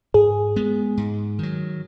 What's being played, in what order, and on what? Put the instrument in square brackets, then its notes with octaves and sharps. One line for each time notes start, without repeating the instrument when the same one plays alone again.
[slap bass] G#2 [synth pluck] G#4
[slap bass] G#3 B3
G#2
D#3 F#3